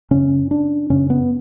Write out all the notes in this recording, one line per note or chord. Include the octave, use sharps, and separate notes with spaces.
F#2 C#3 C#4
D4
F#2 C#3 C#4
B3